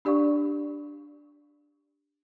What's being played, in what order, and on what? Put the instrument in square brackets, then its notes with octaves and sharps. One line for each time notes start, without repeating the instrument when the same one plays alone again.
[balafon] D4 G4 D5 F5 C#6